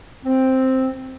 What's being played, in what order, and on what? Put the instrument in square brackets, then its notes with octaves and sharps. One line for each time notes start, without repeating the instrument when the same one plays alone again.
[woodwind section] C4